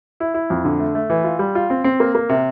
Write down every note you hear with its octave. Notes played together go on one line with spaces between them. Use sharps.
E4
E4
F2
D3
A3
A3
E3
F4
G3
F4
C4
C4
A#3
A#3
C3